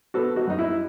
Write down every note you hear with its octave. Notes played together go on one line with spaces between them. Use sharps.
B3 F#4 A4
D#4 F#4
F#2 D#4
E4